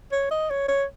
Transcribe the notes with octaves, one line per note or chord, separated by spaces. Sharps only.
C#5
D#5
C#5
C#5